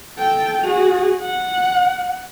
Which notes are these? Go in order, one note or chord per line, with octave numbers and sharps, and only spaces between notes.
A4 G5
F#4 G#4
F#5